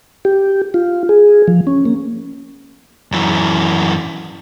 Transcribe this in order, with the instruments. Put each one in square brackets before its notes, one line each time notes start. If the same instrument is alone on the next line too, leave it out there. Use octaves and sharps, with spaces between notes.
[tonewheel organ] G4
F4
G#4
F3
C#4
A#3
[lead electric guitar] F#2 E3